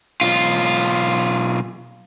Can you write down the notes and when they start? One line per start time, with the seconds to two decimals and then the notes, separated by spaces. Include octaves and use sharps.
0.21 B1 F4